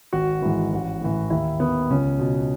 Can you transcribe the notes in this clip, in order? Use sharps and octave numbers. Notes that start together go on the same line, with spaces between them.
G#1 F#4
G#2 E3
A1
A2 E3
D#2 E4
D#3 B3
C#2 C#4
B2